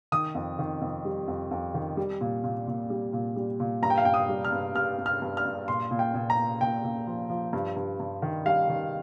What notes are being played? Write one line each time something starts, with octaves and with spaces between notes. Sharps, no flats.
D#3 D#6
F2
D#3
F2
G3
F2
F2
D#3
G3
A#2
A#2
A#2
G3
A#2
G3
A#2
G2 A#5
G5
F5
G2 G5
D#6
G3
F6
G2
G2 F6
G2
F6
G2
F6
G2
A#2 C6
A#2
G5
A#2
A#5
A#2
A#2 G5
A#2
F3
F3
G2
G2
G2
D#3
G3 F5
D#3